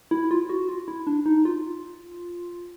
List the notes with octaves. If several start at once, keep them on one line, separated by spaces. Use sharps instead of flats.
E4
F4
F#4
F4
E4
D4
D#4
F4